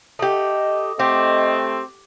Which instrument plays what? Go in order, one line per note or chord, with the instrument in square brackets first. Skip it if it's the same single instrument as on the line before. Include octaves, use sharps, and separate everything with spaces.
[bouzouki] A3 G4 [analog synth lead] D#5
[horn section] A3 C4 [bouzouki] G4